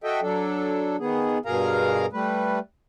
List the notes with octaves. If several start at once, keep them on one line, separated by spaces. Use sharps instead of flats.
F#4 A4 D#5 E5 G5
F#3 D4 A4
D#3 B3 G#4
G2 B2 G#4 A#4 F5 A#5
G3 A3 B4